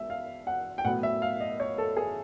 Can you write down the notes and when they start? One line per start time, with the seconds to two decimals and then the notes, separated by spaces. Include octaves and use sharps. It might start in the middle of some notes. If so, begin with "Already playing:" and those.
Already playing: G#3 B3 E5
0.10 F5
0.47 F#5
0.78 G5
0.84 A2 F#3 B3 F#5
1.03 E5
1.22 F5
1.40 D#5
1.60 C#5
1.78 A4
1.97 G#4